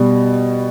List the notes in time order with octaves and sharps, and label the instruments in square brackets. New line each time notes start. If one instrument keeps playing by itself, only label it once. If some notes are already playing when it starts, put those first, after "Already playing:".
Already playing: [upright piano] B2 G3